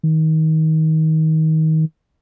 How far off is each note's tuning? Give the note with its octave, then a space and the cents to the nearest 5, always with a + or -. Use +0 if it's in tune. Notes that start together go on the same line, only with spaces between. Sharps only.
D#3 +25